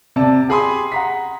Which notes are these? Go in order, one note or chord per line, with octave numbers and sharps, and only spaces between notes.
C3 D5 A5
G4 G#4 G#5 B5 C6 D#6
F#5 A#5 B6